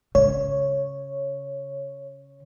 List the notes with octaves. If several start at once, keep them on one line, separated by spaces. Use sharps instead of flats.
C#3 C#5